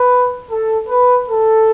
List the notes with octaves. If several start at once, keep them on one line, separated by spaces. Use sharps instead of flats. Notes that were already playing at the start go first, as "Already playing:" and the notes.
Already playing: B4
A4
B4
A4